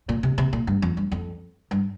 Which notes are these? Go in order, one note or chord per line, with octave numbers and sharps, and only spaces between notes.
A#2
C3
C3
A#2
G2
F2
G2
F2
G2